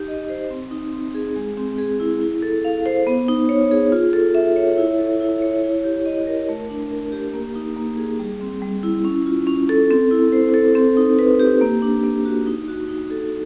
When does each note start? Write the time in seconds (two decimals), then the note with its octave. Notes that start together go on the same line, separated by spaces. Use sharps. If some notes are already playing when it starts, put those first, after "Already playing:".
Already playing: D#4 G4
0.08 D#5
0.29 C5
0.50 C4
0.71 D#4
0.92 C4
1.15 G#4
1.36 G#3
1.57 C4
1.78 G#4
2.00 E4
2.21 E4
2.42 A4
2.65 F5
2.86 C5
3.07 B3
3.28 D#4
3.49 C#5
3.71 G#4
3.92 F4
4.13 A4
4.35 E5
4.56 C#5
4.78 E4
4.99 A4
5.21 E4
5.42 C#5
5.63 E4
5.84 G4
6.06 D#5
6.27 A#4
6.49 A3
6.70 D4
6.92 A#4
7.12 G4
7.34 A#3
7.55 D#4
7.77 A#3
7.97 G#4
8.19 G3
8.41 C4
8.62 G3
8.83 E4
9.05 C#4
9.26 F4
9.47 C#4
9.69 A4
9.91 C4
10.11 E4
10.32 C5
10.54 A4
10.75 C4
10.97 D#4
11.19 B4
11.40 G4
11.61 A#3
11.82 D4
12.04 A#3
12.25 F#4
12.47 D#4
12.68 F#4
12.89 D#4
13.11 A4